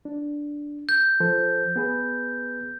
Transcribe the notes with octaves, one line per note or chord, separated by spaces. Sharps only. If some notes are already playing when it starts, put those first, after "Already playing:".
D4
G6
F3 A4 C5
B3 G#4 B4